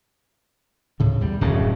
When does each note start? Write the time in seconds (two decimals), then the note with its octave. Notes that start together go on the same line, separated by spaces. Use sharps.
1.00 D2 A2 C#3
1.21 E2 G3
1.41 D1 F#2 A2 C#3